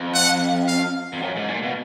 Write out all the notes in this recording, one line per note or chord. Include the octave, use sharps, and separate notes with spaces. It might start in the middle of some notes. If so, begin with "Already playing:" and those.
Already playing: F2
F#5
F5
F2
F#2
G#2
A#2
B2